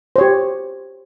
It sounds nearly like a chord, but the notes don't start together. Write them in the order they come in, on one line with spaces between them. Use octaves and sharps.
C5 C#5 G4